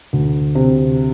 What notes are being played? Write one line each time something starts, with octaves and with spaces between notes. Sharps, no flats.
D2
C3